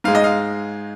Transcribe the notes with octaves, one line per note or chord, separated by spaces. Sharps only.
G#2 G#3 F5
D#5
F5